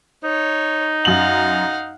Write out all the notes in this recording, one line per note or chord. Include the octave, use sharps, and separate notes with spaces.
D#4 C#5
F#2 F5 F#5 F#7